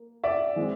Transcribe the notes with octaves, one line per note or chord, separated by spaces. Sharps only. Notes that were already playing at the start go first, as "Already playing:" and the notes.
Already playing: A#3
D5 E5
E3 G#3 C4